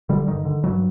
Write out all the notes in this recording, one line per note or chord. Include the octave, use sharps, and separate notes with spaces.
D3 G3
G2 D#3
D3
G2 F#3